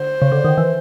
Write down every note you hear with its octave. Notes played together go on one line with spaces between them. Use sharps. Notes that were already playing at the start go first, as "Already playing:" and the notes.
Already playing: D3 C5
C#3
D3
D#3
E3